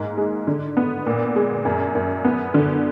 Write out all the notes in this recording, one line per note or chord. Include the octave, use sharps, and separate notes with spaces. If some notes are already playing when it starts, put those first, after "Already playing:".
Already playing: G#2 A#3
G#3
D3
B3
A#2
G#3
F#2
F#2
B3
D3